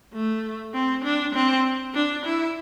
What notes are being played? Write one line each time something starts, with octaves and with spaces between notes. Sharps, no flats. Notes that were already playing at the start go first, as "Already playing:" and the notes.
A3
C4
D4
C4
D4
E4